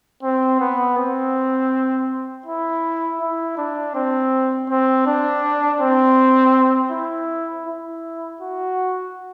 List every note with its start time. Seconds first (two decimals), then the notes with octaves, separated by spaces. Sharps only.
0.24 C4
0.60 B3
0.98 C4
2.46 E4
3.21 E4
3.58 D4
3.95 C4
4.70 C4
5.07 D4
5.81 C4
6.92 E4
7.67 E4
8.41 F#4